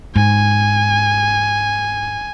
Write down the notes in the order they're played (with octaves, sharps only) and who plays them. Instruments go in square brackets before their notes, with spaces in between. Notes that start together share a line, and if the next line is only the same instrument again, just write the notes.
[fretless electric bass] G#2 [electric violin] G#5